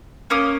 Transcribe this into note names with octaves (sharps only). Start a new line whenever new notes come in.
A#3 C#4 D#6